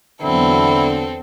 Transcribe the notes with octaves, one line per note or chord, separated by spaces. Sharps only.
E2 D3 F#3 B3 C4 E4 A4